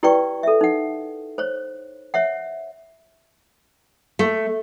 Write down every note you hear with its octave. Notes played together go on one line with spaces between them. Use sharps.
E4 G4 B4 D5 G5 C#6
A4 E5
D#4 F#5
C5 C#5
C#5 E5 F#5
A3